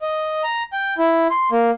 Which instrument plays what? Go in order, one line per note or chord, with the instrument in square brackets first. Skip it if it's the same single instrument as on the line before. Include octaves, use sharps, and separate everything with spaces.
[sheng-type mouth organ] D#5
A#5
G5
E4
C6
A#3